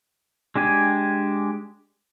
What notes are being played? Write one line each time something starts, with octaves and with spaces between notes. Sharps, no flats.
G#3 D4 G4 G#5